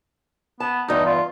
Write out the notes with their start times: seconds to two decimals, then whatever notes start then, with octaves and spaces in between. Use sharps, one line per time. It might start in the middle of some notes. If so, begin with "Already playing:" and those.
0.60 B3 A5
0.88 E2 G2 D#4
1.06 F4